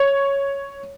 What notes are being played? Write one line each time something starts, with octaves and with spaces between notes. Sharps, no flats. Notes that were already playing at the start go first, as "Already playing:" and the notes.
Already playing: C#5